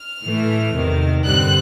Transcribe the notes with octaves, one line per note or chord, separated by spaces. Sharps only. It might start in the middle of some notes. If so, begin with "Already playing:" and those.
Already playing: F6
A2 E3 A3
E2 C3 D#3
G2 D3 G3 C4 F#6